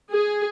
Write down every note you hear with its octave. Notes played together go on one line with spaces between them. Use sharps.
G#4